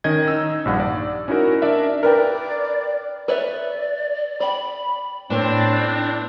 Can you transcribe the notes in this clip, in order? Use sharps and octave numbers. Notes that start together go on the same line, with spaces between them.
D#3 C#4 D#5 G#6
D#4 E6
A#1 G2 F#5
D5
C#4 D#4 E4 F#4 A#4
D4 A#4 D5 E5
A#4 B4 D5 G5
B4 C#5 D5 E5
D5 G5 B5
A2 B3 C4 D4 C#5